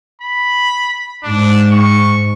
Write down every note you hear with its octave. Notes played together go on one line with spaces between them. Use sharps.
B5
G#2 D4
C#6